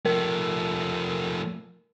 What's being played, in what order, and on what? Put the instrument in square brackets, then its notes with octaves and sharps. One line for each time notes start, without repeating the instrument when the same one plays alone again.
[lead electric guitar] F3 A3 [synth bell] A#4